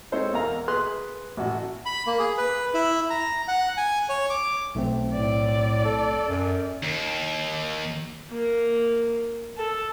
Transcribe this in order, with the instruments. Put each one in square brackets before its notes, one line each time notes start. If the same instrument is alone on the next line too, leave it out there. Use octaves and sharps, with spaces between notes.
[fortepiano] G#3 C4 D#4 A4 C5 C#5
E2 A#3 A4 F5 A#5
G#4 B4 C6 F#6
A1 A3 F#4 F#5
[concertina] B5
A#3
G#4
B4
E4
A#5
F#5
G#5
C#5
D6
[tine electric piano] B1 A3 C4
[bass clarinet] A2 [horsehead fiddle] D5
[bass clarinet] A4
F#2
[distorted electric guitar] D#2
[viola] A#3
A4